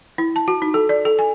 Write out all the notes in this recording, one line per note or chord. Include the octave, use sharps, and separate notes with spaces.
E4
A5
F#4
D#4
A4
D5
A4
G#5